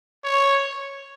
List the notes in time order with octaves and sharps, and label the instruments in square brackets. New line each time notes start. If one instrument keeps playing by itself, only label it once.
[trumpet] C#5